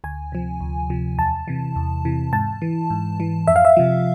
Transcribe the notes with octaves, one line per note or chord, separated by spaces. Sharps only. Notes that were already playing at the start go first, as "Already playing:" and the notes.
D2 G#5
C3 F3
D2
C3 F3
E2 A5
C3 E3
E2
C3 E3
G#2 A5
E3
G#2
E3
F2 E5
F5
E5
C3 F3